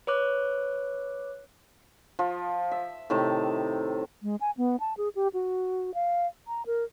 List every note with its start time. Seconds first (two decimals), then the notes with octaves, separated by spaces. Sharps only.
0.07 B4 C#5 D6 F#6
2.19 F3
2.72 E5
3.10 A2 C3 D#3 A5
4.23 G#3
4.41 G#5
4.57 B3
4.80 A5
4.97 G#4
5.15 G4
5.34 F#4
5.94 F5
6.48 A#5
6.66 A#4